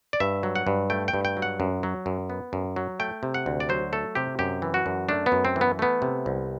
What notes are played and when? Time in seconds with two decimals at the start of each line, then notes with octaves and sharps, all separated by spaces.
0.13 D5
0.20 G2 E5
0.43 F#3
0.55 F#5
0.67 G2
0.90 A3 G5
1.08 G5
1.14 G2
1.25 G5
1.37 F#3
1.42 F#5
1.60 F#2
1.83 F#3
2.06 F#2
2.30 B3
2.53 F#2
2.76 F#3
3.00 A3 G5
3.23 C3
3.34 F#5
3.46 D2
3.60 D5
3.69 F#3 C5
3.93 A3 A4
4.15 C3 G4
4.39 F#2 G4
4.62 E3
4.74 F#4
4.86 F#2
5.09 A3 D4
5.26 B3
5.32 F#2
5.45 C4
5.56 E3
5.61 B3
5.79 A3 B3
6.02 C3
6.26 C2